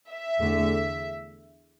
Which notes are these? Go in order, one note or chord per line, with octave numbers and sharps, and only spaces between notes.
E5
E2 D3 A3